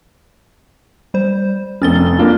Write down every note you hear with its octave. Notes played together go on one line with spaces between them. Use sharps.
G3 C5
F1 F2 C#4 A6 G7
A#3 D4 F4